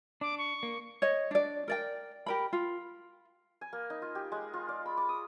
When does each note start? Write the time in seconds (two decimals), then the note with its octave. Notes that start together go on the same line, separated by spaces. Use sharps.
0.21 D4 D6
0.38 C#6
0.63 A#3
1.02 C#5 D#5
1.31 D4 D5
1.68 A#4 D5 G5
2.26 G4 A#4 B5
2.53 F4
3.61 G#5
3.73 A#3
3.90 D#4
4.02 F4
4.15 G4
4.32 G#3
4.54 F4
4.69 D5
4.86 B5
4.97 D6
5.09 D#6